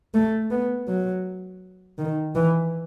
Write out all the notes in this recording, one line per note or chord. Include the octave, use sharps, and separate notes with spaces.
A3
B3
F#3
D#3
E3